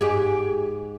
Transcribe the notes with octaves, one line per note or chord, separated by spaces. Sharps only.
G#2 G4 G#4